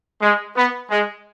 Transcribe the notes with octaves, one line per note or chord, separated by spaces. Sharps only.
G#3
B3
G#3